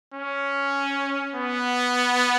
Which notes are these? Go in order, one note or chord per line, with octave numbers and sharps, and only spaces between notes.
C#4
B3